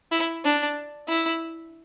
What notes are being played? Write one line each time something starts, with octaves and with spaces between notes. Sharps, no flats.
E4
D4
E4